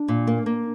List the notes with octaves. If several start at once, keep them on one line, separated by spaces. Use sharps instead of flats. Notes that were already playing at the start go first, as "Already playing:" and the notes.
Already playing: D4
A#2
A#3
A#3